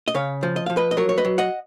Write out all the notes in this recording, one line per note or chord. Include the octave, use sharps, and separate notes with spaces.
D#5
C#3 C#5 F5
F3
D#5
F3 F5
B4 D#5
D#5
F#3 A#4 C#5
C#5
B4 D#5
F#3
D#5 F#5